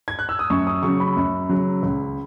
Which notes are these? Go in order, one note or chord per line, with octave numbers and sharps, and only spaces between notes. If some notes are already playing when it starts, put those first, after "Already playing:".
G#6
F#6
E6
D#6
F#2 C#6
D#6
C#3 F#3 C#6
B5
F#2
C#3 F#3
C#2